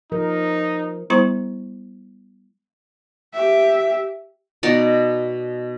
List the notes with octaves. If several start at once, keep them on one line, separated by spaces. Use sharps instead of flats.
F3 D#4 A#4
G3 B3 E4 C5 A#5 C#6
G4 E5
B2 D#4 D5 F#5